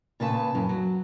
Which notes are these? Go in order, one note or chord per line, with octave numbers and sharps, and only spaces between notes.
A#2 C#3 B4 A5
F#2
F#3